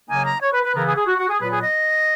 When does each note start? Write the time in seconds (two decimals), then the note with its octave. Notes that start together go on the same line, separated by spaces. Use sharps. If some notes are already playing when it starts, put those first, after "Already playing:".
0.09 C#3 F#3 A#3 D#4 G#5
0.25 A#5
0.42 C#5
0.53 B4
0.63 B4
0.75 C#3 E3 B3 E4 A#4
0.86 G#4
0.96 G#4
1.07 F#4
1.18 F#4
1.29 G#4
1.40 A#2 F#3 B3 B4
1.51 G#4
1.62 D#5